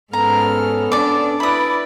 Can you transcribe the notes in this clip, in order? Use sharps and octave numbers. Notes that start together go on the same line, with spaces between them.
G#2 B3 C#4 A4 A#5 F6
D4 D5 D6
E4 B4 D5 B5 D#6